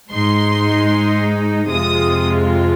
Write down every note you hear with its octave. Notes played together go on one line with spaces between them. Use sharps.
G#2 G#3 D#4 C6
F2 C3 G#3 F4 D#6